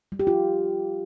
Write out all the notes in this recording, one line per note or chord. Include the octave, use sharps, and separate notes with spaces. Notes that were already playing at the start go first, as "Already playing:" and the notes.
G3
G4
F4